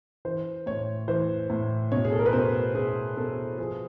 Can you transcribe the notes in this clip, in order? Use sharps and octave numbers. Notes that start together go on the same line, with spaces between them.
E3 C5
A2 C#5
E3 C5
A2
B2 C#5
G#4
A4
A#4
B4
B2 C5
B2 G#4
B2 A4
F3 G#4